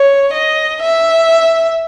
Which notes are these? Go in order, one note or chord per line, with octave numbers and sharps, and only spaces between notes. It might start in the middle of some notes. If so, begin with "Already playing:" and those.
Already playing: C#5
D#5
E5